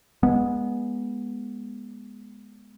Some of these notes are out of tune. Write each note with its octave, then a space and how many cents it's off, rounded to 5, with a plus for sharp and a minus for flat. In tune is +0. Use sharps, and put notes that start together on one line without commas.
G#3 +0 B3 -20